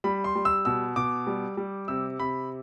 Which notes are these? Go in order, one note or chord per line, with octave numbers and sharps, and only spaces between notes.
G3 B5
C6
G3
E6
B2 E6
B2 D6
G3
G3
C3 E6
C3 B5